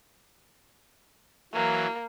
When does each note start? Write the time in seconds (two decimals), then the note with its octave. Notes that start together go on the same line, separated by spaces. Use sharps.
1.53 E3 F#3 A#3